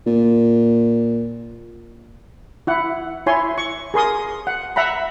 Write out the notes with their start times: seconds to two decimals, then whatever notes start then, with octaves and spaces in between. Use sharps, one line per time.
0.06 A#2
2.67 E4 F#5
3.26 E4 C#5 G#5 C6
3.58 C#6
3.94 G#4 A#4 C6 D#6
4.47 F#5
4.76 E5 F#5 A#5 B5